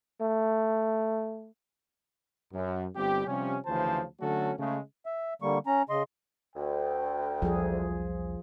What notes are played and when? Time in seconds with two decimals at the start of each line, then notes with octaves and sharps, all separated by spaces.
0.22 A3
2.53 F#2
2.96 G1 G3 C4 G4
3.27 C3 F3 G3 C#4
3.66 D2 C#3 E3 F3 C5 A5
4.21 D3 F#3 A3 C#4 F#4 A4
4.59 C#3 G#3 A3
5.06 E5
5.42 D3 G3 A#3 C#6
5.67 C#4 A#5
5.90 C#3 D#5 C6
6.56 D2 G5
7.42 B1 E2 F3 G3 G#4